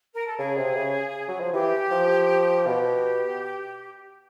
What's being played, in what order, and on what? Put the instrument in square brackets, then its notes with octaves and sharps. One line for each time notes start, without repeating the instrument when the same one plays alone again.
[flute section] A#4
A4
[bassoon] C#3 [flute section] G#4
[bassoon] C3
C#3
F#3
F3
[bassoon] E3 [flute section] G4
[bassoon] F3
[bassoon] B2 [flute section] G4